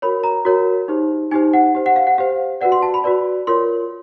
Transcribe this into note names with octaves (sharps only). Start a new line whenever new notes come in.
F#4 A#4 C#5 B5
A#5
F#4 A#4 C#5
D#4 G4 C5
D#4 G4 C5 G#5
F#5
G4 C5
F#5
F5
F#5
G4 C5 F5
F#4 B4 D5 F#5
C6
A5
B5
F#4 B4 D5
F4 A#4 C#5 C6